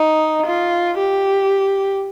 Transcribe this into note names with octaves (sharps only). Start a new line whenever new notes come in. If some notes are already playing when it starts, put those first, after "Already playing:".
Already playing: D#4
F4
G4